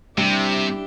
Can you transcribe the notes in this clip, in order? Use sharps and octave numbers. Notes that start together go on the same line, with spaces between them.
C3 G3 D4 E4 G4